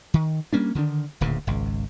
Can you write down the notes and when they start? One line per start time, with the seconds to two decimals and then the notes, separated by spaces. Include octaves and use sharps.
0.14 D#3
0.53 G3 A#3 C#4 D4
0.75 D3 D#3 C#4 D4
1.21 D1 D2 A#2 C#3
1.47 G#1 C#2